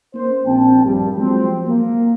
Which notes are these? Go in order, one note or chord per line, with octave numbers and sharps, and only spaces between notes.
A#3 C#4 C5
A#1 C4 G5 A5
A#1 G2
F3 F#3 G#3 B3 C4
A#3